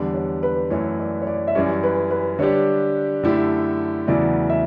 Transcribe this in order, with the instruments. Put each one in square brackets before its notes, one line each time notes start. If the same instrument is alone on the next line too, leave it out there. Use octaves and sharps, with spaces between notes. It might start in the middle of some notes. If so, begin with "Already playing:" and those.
Already playing: [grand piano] E2 D3 G3 [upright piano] D5
[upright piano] C#5
B4
[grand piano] F#2 E3 A3 [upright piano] C#5
[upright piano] D5
C#5
D5
E5
[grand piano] F#2 E3 G3 C#4 [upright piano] D5
[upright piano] B4
B4
[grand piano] D3 G3 D4 G4 [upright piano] C#5
[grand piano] F#2 D3 A3 E4 G4
[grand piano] E2 C#3 F#3 A3 E4 [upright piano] D5
[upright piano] E5